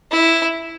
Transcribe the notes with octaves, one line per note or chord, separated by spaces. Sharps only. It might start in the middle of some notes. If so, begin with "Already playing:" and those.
E4